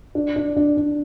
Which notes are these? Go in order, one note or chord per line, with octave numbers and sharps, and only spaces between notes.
D4
D4
D4
D4